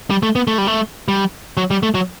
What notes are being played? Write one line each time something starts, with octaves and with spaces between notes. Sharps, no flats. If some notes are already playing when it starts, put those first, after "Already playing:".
G3
A3
B3
A3
G3
A3
G3
F#3
G3
A3
F#3